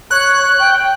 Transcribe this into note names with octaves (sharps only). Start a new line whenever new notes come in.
C#5 F#6
G5